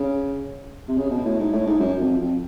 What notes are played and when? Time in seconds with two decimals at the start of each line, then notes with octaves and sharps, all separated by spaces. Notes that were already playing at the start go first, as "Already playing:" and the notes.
Already playing: C#3
0.88 C3
0.97 C#3
1.10 B2
1.25 A2
1.39 G#2
1.52 A2
1.66 G#2
1.79 F#2
2.00 F2
2.20 F2